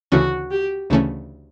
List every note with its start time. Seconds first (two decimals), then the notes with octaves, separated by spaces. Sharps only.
0.12 D2 C#3 E3 A3 C#4 F#4
0.51 G4
0.90 D2 C#3 E3 A3 C#4